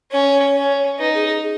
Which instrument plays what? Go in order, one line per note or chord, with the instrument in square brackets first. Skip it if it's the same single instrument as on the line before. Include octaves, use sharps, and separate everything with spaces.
[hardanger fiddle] C#4 [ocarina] C#5
[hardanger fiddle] C#4
[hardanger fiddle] D#4 [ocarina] B4
[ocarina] G#4
G#4
G#4